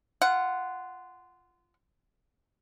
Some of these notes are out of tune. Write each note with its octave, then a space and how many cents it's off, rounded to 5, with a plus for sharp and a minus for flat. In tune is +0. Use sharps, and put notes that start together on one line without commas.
F4 -15 F#5 +0